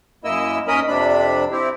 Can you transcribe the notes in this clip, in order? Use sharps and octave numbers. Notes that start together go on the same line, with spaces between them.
F#2 A#3 E4 D#5 E6
D#2 C#4 A#4 D#5 B5 D#6
F2 C3 D4 B5
C4 E4 G4